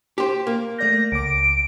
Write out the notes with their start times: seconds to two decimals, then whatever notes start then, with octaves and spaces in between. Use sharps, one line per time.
0.18 G4 C5
0.47 A#3
0.79 A3 D5 G6 A#6
1.12 C#2 D6 D7